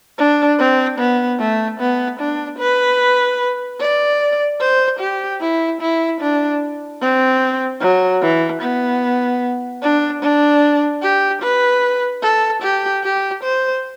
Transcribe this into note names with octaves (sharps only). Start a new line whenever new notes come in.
D4
C4
B3
A3
B3
D4
B4
D5
C5
G4
E4
E4
D4
C4
F#3
E3
B3
D4
D4
G4
B4
A4
G4
G4
C5